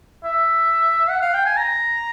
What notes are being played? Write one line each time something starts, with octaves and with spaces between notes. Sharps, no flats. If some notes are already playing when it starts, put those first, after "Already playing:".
E5
F#5
F5
G5
G#5
A#5